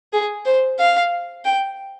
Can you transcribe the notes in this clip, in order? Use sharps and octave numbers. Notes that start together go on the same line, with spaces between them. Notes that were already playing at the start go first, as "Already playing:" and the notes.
G#4
C5
F5
G5